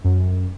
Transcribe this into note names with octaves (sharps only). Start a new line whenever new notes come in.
F#2